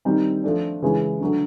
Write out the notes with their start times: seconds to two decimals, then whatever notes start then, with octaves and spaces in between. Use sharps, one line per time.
0.05 D#3 G3 C4 D#4
0.44 F3 A3 D4
0.82 C#3 E3 G#3 C#4
1.20 D3 F#3 A3